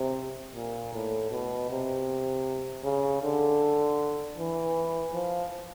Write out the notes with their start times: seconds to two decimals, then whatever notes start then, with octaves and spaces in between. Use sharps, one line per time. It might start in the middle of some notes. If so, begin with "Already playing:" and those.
Already playing: C3
0.55 A#2
0.94 A2
1.31 B2
1.70 C3
2.84 C#3
3.23 D3
4.38 E3
5.13 F3